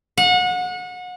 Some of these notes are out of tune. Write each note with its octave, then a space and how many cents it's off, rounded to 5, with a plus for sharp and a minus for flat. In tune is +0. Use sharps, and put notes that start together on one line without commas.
F#5 -30